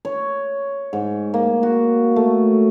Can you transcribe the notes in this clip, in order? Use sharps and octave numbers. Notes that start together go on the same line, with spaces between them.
C#5
G#2
A#3
F#4
A3